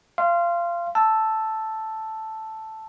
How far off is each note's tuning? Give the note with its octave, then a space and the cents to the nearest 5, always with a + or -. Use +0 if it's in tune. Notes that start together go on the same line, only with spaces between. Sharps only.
F5 -25 C6 +0
A5 +0 E6 +0